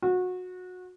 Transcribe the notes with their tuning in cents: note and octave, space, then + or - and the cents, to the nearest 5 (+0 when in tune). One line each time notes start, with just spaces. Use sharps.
F#4 -25